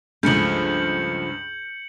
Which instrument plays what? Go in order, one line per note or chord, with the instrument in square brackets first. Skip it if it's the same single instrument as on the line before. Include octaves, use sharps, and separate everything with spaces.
[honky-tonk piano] C#2 G2 [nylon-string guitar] F3 G#3 A3 [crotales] G6 C#7 F#7